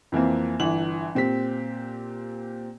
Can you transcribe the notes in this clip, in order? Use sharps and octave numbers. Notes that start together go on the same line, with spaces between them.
F2 E3 A#3 C4
G1 E3 F#7
A#2 C4 G4 B6